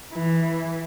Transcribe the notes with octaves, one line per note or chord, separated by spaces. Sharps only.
E3